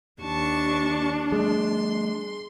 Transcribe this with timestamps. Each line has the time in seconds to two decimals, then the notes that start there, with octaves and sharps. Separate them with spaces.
0.22 D#2 D4 A5 C#6
1.32 G3 A3 G#4 C6